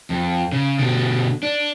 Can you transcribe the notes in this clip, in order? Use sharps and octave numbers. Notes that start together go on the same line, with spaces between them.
F2
C#3
B2 D3
D4